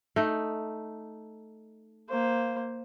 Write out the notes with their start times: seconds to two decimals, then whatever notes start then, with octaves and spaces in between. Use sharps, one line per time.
0.16 A3 D#4
2.09 A#3 C5